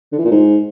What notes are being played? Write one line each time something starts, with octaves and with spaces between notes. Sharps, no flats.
D3
E3
A#2
G#2